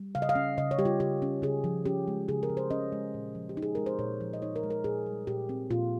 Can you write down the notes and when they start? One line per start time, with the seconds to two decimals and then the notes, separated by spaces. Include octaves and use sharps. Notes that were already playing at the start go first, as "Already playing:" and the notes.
Already playing: G3
0.15 C#3 F5
0.22 D#5
0.29 F5
0.35 C#4
0.57 C#3 D#5
0.71 C#5
0.79 G3 G4
0.85 F4
1.00 C#3 G4
1.22 C#4
1.42 C#3 G#4
1.64 F3
1.85 C#4 G4
2.08 G#3
2.28 C#3 G#4
2.43 A#4
2.49 F3
2.57 C5
2.70 C#4 D#5
2.92 G#3
3.14 A#2
3.35 F3
3.49 G4
3.57 D#4
3.62 G#4
3.75 G#3 A#4
3.86 C5
3.99 A#2 C#5
4.21 F3
4.33 D#5
4.42 D#4 C#5
4.56 A#4
4.63 G#3
4.70 A#4
4.84 A#2 G#4
5.06 G3
5.27 A#2 G4
5.49 C4
5.70 A#2 F4